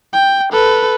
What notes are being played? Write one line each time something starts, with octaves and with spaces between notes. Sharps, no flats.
G5
A4 B4